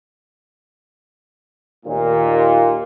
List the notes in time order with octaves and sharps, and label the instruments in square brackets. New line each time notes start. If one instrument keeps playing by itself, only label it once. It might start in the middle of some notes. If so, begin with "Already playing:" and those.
[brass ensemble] D#2 A#2